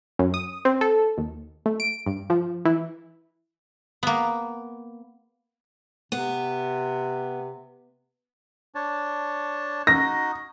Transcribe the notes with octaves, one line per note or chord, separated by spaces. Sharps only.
F#2
D#6
C4
A4
D#2
A3
D7
G2
F3
E3
A#3 B3
C3 B3
D4 C#5 A5
D#4 F#4 A#6